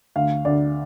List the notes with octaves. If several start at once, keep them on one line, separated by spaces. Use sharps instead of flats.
D2 F5
D2 D5